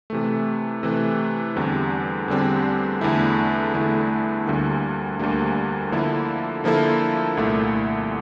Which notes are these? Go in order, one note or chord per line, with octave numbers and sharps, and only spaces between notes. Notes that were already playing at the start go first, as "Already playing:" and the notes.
C3 E3 A3
C3 E3 A3
E2 D3 G3 C4
E2 D3 G3 C4
E2 D3 A3 E4
E2 D3 A3 E4
D2 D3 G3 A#3
D2 D3 G3 A#3
D3 F3 A#3 E4 A4
D3 F3 A#3 E4 A4
C2 A#2 A3 E4